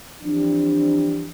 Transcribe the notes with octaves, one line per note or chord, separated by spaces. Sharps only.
E3 F3 G3 C4 D4